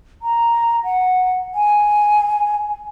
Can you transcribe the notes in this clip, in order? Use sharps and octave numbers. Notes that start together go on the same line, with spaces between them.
A#5
F#5
G#5